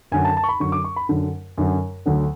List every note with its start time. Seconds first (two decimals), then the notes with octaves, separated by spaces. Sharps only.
0.12 F#2 D3 F#3 G#5
0.24 A5
0.37 A5
0.44 C#6
0.49 B5
0.60 F#2 D3 F#3 C#6
0.72 D6
0.84 C#6
0.96 B5
1.09 F#2 D3 F#3
1.58 F#2 D3 F#3
2.06 D2 D3 F#3